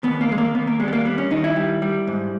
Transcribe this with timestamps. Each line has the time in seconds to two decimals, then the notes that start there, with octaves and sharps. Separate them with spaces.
0.03 D#2 B3
0.21 A#3
0.29 D#2 G#3
0.38 A#3
0.55 D#2 B3
0.67 A#3
0.80 G3 G#3
0.88 B3
0.93 A#3
1.05 G3 B3
1.18 C#4
1.31 D#3 D#4
1.44 E4
1.56 G3
1.82 G3
2.08 G#2